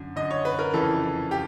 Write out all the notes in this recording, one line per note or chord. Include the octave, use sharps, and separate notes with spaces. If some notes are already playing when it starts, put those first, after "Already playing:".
Already playing: F#2 D3
F#2 D3 D#5
C#5
B4
A#4
F2 C#3 E3 A4
G4